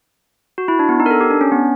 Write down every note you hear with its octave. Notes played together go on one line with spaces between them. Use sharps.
F#4
E4
D4
B3
D#4
A#4
A4
G4
D4
C#4
B3